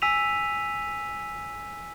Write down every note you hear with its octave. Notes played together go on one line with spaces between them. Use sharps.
G#5 E6 B6 D#7 F7